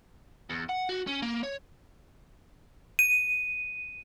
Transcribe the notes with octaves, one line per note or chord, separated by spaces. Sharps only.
E2
F#5
F#4
C#4
A#3
C#5
D#7